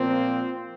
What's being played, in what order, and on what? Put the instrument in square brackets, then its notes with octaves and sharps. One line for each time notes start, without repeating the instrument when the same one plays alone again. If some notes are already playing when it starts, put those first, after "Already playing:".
Already playing: [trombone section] A#2 F3 A#3 C4